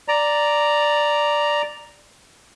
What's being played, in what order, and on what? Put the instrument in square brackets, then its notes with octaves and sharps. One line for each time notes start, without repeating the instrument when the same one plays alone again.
[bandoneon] D5 A#5